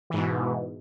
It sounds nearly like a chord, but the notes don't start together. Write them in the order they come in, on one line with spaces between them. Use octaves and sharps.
E3 G#2 B2